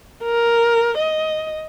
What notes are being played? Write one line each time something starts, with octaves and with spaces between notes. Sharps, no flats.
A#4
D#5